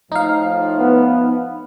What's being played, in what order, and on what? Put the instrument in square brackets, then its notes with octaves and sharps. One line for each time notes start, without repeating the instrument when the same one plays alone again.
[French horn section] A2 F3 [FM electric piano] D#4 F5
[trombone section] B3